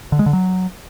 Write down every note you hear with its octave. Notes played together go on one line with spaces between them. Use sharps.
D3
G#3
D3
F#3